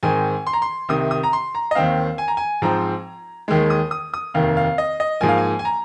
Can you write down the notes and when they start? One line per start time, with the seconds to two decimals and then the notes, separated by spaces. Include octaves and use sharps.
0.03 G#2 D#3 C4 G#5
0.47 C6
0.53 A#5
0.62 C6
0.89 C2 C3 D#3 D#6
1.11 D#6
1.23 A#5
1.33 C6
1.55 A#5
1.71 D#5
1.75 D#2 D#3 C4 F5
2.18 G#5
2.28 A#5
2.37 G#5
2.62 G#2 F3 C4 A#5
3.48 D#2 D#3 G#3
3.70 D#6
3.91 D#6
4.14 D#6
4.34 F1 D#2 D#3 F5
4.57 F5
4.78 D#5
5.00 D#5
5.21 G#2 F3 A#3 G#5
5.29 F5
5.38 G#5
5.59 G#5
5.65 A#5